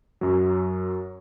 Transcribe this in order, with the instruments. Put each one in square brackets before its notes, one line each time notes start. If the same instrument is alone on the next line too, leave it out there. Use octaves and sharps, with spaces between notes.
[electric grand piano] F#2 F#3